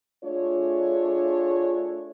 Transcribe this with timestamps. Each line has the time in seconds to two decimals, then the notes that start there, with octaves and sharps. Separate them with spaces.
0.24 A3 D4 F4 G#4 C#5